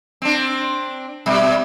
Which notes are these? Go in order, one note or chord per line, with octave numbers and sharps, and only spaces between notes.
C4 D4
B2 G3